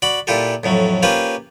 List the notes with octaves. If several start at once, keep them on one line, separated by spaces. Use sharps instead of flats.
F#4 D5 B5
A#2 E4 F4 G4 A4
F2 A2 F#3
A#3 C#4 F4 G4 B4 C5